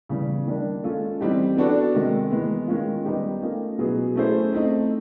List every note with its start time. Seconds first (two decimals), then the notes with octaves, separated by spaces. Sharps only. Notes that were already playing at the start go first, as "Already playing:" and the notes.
0.09 C#3 E3 G3 B3
0.47 D#3 G3 A#3 D4
0.84 G#3 C#4 F4 A4
1.21 E3 G3 C4 D#4 G4
1.57 B3 D4 F#4 A4 D5
1.94 C3 D#3 G#3
2.31 E3 G#3 B3
2.68 D#3 G#3 C#4 F4
3.05 G3 B3 D#4 G4
3.42 A3 C#4 F4 A#4 D#5
3.79 B2 F#3 B3 E4 G#4
4.15 A3 C#4 E4 G#4 C5
4.52 A3 C4 D#4